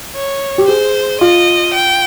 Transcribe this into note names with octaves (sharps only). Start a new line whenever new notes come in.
C#5
G4
G#4 C5
F4 D#5
G5